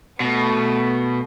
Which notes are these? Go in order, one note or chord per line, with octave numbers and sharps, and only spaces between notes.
B2 A3 B3